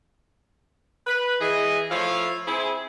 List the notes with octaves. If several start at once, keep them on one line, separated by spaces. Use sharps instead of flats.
B4
E3 G#4 D#5
F3 A3 E4 F4 C#5 F5
C4 E4 G#4